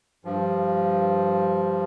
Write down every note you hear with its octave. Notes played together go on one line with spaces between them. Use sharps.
G2 F3